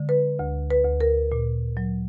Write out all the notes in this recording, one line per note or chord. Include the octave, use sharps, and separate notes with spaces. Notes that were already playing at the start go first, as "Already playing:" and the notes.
Already playing: D3 G#3
B4
D2
B4
D2
A#4
A#2
F#3